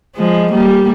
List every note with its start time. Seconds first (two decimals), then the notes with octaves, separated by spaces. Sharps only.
0.17 F3 G#3
0.52 G3 A#3